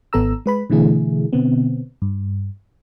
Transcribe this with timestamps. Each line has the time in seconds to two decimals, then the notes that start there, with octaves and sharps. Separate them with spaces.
0.13 G#1 B3 A4 A#5 E6
0.46 G#3 B4 B5
0.70 B2 D3 E3 A3 E4 G#4
1.33 B2 D3 B3 C4
2.02 G2